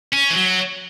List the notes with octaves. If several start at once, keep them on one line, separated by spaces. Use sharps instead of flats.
C#4
E3
F#3